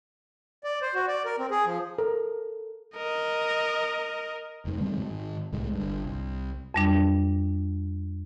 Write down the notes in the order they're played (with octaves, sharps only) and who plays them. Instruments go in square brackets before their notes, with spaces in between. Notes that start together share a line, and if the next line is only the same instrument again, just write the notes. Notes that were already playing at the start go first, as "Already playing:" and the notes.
[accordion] D5
C5
F#4
D5
A#4
C4
G#4
F3
[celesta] A4 [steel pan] A#4
[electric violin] A#4 D#5
[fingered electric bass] F1 G#2
D#3 G3 G#3 C4
G#2 D#3
C2 A2 G#3
G1 G2
C2
[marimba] F2 G3 D4